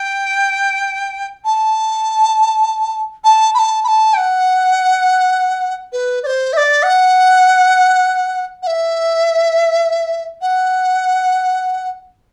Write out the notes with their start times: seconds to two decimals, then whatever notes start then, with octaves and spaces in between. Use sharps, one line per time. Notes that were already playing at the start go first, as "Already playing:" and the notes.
Already playing: G5
1.44 A5
3.24 A5
3.54 B5
3.59 A5
3.84 B5
3.88 A5
4.14 G5
4.17 F#5
5.92 B4
6.23 D5
6.26 C5
6.53 E5
6.57 D5
6.83 F#5
8.62 F#5
8.67 E5
10.41 F#5